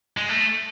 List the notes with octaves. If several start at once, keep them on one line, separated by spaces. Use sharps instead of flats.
G#3
A3